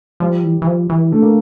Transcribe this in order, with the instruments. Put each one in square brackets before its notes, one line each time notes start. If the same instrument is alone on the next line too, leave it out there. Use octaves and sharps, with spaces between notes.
[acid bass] F3 [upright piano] G3
[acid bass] E3
E3
F3
E3
[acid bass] D3 [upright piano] A3
[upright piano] A#3